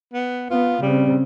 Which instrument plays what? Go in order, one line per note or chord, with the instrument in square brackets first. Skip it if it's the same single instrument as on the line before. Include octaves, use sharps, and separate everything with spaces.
[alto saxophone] B3
[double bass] B3 [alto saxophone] F4
[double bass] C#3 C4 [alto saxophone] G3